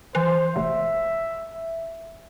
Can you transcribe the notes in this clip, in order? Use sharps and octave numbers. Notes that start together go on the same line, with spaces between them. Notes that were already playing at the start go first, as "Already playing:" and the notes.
E3 C5
F1 E5